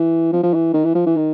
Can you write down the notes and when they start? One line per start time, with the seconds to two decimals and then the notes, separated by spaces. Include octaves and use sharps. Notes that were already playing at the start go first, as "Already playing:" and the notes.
Already playing: E3
0.32 F3
0.43 F3
0.54 E3
0.74 D#3
0.85 E3
0.95 F3
1.06 E3
1.16 D#3